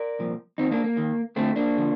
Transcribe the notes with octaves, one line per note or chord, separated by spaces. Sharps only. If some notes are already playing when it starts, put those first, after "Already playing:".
Already playing: A#4 D5
C2 A#2 F3
D#2 D#3 C4 D#4
A#3 D4
A#3
D#2 D#3
F2 D3 F3 A3 C4
A#3 D4
D3 F3